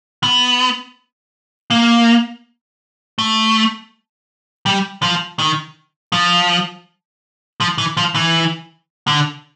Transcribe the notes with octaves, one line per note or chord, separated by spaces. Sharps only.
B3
A#3
A3
G3
F3
D#3
F3
F3
E3
F3
E3
D3